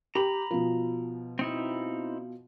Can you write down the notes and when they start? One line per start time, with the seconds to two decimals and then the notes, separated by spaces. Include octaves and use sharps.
0.15 G4 A#5 B5
0.51 B2 F3
1.39 C4 D#4 E4